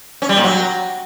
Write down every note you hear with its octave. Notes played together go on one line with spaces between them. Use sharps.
C#4
G3
A#2
F#3